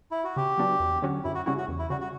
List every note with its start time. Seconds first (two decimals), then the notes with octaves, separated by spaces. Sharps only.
0.11 E4
0.24 F#4
0.36 C#3 G4
0.58 F#3 B3 D4 F#4
0.80 E2
1.02 D3 F#3 C#4 F#4
1.24 F#2 E4
1.35 F#4
1.46 C#3 G3 C#4 E4 F#4
1.58 F#4
1.68 E2
1.79 E4
1.90 C#3 G3 F#4
2.01 F#4